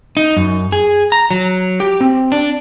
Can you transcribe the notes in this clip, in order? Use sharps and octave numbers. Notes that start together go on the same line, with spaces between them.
D#4
F#2
G#4
A#5
F#3
G4
C4
D4